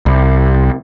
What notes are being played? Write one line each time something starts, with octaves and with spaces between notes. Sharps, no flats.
C2